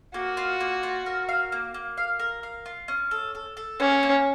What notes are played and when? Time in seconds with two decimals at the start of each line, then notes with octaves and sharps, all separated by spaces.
0.14 A#3 F#4
0.37 F4
0.61 A#3
0.83 F4
1.06 A#4
1.29 F5
1.52 A#3
1.74 A#3
1.97 F5
2.19 A#4
2.43 F5
2.66 F4
2.88 C#4
3.11 A4
3.35 A4
3.57 A4
3.80 A#3 C#4
4.03 A#3